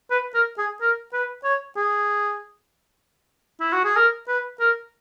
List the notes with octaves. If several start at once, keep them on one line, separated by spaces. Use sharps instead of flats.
B4
A#4
G#4
A#4
B4
C#5
G#4
E4
F#4
G#4
A#4
B4
A#4